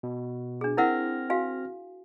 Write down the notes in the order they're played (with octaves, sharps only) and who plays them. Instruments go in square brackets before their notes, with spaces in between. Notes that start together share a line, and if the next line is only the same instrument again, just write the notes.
[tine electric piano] B2
[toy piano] D4 G#4
[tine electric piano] C4 F6 A#6 [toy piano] E4 A#4 F#5
[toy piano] F#4 F5 G#5